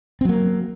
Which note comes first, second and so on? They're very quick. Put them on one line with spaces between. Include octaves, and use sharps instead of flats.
C4 F#3 A#3